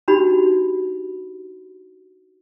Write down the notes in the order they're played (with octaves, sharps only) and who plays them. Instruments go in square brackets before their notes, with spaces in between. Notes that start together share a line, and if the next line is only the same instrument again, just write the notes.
[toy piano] D4 D#4 F#4 G4 B5